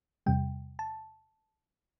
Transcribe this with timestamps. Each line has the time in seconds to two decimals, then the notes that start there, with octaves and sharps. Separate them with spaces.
0.26 E2 C3 G3 G5
0.79 A5